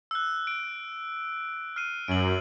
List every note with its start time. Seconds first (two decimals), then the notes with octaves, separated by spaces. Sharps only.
0.11 E6 F#6
0.47 D7
1.76 F6 C7 D#7
2.08 F#2 D7 F#7